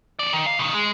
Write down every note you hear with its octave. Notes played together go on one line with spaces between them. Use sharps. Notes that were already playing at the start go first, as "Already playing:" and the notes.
F2 D5
D#3
F5
B2 D#3
G#3